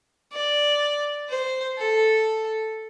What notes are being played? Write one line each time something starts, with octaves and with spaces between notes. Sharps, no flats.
D5
C5
A4